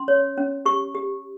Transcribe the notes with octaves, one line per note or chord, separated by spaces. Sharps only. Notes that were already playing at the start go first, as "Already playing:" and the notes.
Already playing: C#4 C6
C#5
C#4
G4 C#6
G4